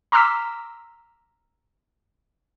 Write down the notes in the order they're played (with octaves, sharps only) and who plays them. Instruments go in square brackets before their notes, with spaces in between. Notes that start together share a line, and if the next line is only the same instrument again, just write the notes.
[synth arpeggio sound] A#5 C6 D6 E6 F6 B6